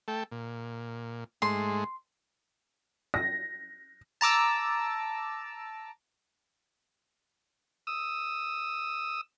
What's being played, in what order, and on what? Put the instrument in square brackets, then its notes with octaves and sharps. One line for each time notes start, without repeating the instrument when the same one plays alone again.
[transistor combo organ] A3 A4 G5
A#2
[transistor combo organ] G#2 G#3 A3 [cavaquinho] C6
[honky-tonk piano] A#6
[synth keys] A5 A#5 D6 E6
[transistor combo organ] D#6 E6